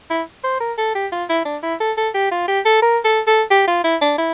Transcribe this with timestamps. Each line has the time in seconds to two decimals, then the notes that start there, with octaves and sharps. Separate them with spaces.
0.10 E4
0.44 C5
0.61 A#4
0.78 A4
0.95 G4
1.12 F4
1.29 E4
1.45 D4
1.63 E4
1.80 A4
1.97 A4
2.14 G4
2.31 F4
2.48 G4
2.65 A4
2.82 A#4
3.04 A4
3.27 A4
3.51 G4
3.68 F4
3.84 E4
4.01 D4
4.18 E4